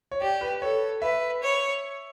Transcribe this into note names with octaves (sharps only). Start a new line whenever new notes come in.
C#5
G4 D5
B4
A4 C#5
B4 E5
C#5